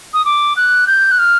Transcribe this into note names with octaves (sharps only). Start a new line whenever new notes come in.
D#6
D6
F#6
G6
F#6
F6